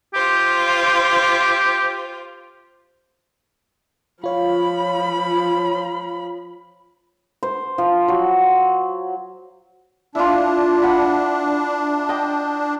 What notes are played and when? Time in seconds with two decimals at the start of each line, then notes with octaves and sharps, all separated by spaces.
0.14 F4 G4 C5
4.24 F3 F4 C#5 F5 B5
7.43 C5
7.78 F3
8.08 F#3
10.15 D4 E4 F4
10.83 F#5 B5
12.09 D#5 G5